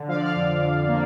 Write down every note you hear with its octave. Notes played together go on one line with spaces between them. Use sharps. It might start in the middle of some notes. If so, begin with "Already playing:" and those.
Already playing: D3
F3 F5
D5
F5
F2
F2
A#3